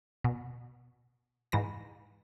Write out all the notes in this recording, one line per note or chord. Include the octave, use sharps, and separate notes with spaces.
B2
G#2 E3 A#6